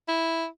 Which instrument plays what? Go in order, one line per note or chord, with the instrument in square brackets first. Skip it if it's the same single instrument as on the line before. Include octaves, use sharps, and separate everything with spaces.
[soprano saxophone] E4